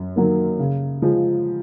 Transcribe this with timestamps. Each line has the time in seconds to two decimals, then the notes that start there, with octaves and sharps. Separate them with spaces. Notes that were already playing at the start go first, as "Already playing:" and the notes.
Already playing: F#2
0.16 D#3 F#3 A#3
0.59 C#3
1.02 F3 G#3